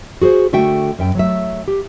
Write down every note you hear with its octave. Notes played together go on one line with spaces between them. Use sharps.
F#4 G#4 B4 C5
D3 A3 F#4 E5 G5
F#2 E5 G5
F#3 A3 E5
G4